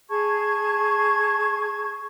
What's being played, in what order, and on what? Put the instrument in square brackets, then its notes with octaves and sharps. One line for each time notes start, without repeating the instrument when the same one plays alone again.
[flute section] G#4 A5 C#6 G#6